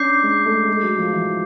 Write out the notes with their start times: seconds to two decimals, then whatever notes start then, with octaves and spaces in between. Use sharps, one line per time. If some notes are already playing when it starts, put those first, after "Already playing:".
Already playing: C#4 D4 D6 G6 C7
0.23 G#3
0.46 A3
0.68 G#3
0.83 F#3
0.98 F3
1.13 E3